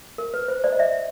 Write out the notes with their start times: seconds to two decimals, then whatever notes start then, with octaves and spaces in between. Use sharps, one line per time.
0.18 A#4
0.34 B4
0.48 C5
0.64 C5 D5
0.72 D#5
0.79 D5 E5